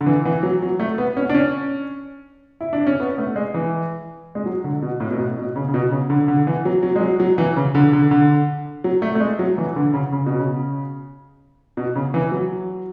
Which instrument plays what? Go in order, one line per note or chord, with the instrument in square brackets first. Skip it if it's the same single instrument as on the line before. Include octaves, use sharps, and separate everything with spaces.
[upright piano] D3
E3
E3
F#3
F#3
A3
B3
C#4
D4
C#4
E4
D4
C#4
B3
A3
G#3
E3
G#3
F#3
D3
B2
A2
B2
A2
B2
C#3
C#3
B2
C#3
D3
D3
E3
F#3
F#3
G#3
F#3
F#3
E3
C#3
D3
D3
D3
F#3
A3
A3
G#3
F#3
E3
D3
C#3
C#3
B2
C#3
B2
C#3
E3
F#3